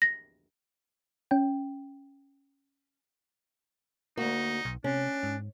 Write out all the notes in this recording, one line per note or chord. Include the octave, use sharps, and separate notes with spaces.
A#6
C#4 G5
D2 A#3 D#4 F#4
B1
C3 C#4 D4
G#2